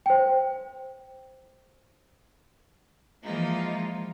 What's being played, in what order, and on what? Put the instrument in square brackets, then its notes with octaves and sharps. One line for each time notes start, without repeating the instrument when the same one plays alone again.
[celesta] C5 G5
[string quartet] E3 F3 G#3 A#3 D#4 F4